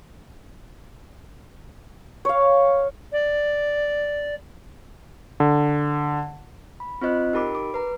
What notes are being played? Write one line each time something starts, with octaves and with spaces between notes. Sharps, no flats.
C#5 F5
D5
D3
B5
C4 F4 C5 D#5 F#6
D#4 G4 A#4 B5 D6
D6
B4 A#5